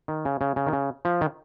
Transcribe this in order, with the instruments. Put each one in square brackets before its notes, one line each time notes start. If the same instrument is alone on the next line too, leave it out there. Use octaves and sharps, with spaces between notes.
[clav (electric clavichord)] D#3
C#3
C#3
C#3
D#3
C#3
F3
D#3